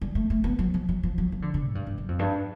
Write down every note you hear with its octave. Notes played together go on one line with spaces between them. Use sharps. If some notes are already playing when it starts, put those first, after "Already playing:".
G3
A3
A3
B3
F#3
F3
F#3
F3
F#3
F3
D3
D3
G#2
G2
G2
F#2
F2
G2